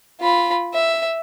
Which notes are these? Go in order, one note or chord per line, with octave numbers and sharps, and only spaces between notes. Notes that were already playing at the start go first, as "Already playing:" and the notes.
F4 B5
E5